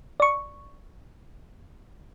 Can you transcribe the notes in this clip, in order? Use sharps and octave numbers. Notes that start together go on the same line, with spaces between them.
D5 C#6